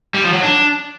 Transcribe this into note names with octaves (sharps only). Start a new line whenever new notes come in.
G3
F3
F#3
D4